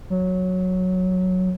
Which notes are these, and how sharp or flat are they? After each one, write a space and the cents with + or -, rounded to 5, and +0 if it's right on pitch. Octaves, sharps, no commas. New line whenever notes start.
F#3 -5